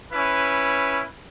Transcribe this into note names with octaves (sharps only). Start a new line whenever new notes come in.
C#4 E4 B4